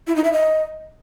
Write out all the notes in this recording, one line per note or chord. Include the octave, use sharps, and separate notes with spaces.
E4
D#4
E5
D#5